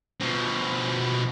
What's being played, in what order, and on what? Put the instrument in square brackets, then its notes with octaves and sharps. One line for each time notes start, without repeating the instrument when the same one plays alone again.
[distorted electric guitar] B2 F3